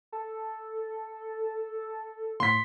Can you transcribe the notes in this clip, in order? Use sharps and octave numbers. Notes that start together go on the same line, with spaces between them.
A4
A2 C6 B6